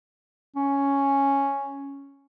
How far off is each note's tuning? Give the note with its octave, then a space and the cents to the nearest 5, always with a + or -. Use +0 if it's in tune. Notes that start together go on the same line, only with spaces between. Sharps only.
C#4 +0